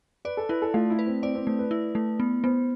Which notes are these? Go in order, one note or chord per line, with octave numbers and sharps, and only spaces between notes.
B4 D5
A4
E4 B4
A4
A3 F4
E4
B4
C4
C4 D5
C4
A3 C4
B4
E4
A3
B3
B3 C5